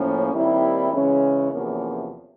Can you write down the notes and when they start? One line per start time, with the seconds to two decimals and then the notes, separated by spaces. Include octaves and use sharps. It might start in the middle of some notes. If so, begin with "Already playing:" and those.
Already playing: A2 F3 A#3 C#4
0.32 D#2 D#3 G3 C4 E4
0.92 C#3 E3 G#3 C#4
1.51 E2 C3 F3 A#3 C#4